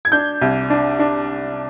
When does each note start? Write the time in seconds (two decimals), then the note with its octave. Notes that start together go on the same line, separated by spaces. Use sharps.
0.05 G#6
0.12 D4 G6
0.41 C2
0.70 D4
0.99 D4